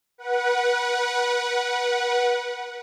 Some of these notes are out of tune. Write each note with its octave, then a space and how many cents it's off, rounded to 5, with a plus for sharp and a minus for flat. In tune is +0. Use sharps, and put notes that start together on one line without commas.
B4 -30 F#5 +0